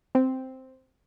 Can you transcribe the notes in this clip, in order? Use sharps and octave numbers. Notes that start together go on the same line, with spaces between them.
C4